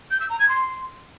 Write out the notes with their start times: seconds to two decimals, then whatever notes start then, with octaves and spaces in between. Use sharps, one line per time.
0.11 G6
0.20 E6
0.30 A#5
0.39 G#6
0.49 C6